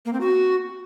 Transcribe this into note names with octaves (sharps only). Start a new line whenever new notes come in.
A#3
C4
F#4